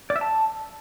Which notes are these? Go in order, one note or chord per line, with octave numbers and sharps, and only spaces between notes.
D5
E5
A5